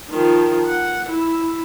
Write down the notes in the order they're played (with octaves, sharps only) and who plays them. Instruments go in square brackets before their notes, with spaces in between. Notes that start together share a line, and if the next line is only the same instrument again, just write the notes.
[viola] D#3 F3
F#5
E4